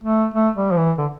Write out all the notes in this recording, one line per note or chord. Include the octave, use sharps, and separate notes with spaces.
A3
A3
G3
F3
E3
D3